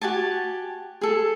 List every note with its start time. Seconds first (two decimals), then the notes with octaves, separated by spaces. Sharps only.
0.02 F#4 G4 G#5 A5
1.01 G#4 A4